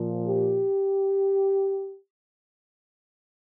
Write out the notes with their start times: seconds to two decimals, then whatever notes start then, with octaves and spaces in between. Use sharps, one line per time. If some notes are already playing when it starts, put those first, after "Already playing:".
Already playing: A#2 F3
0.28 G4